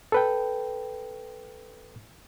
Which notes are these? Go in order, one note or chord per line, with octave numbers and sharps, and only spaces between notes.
A4 B4 G5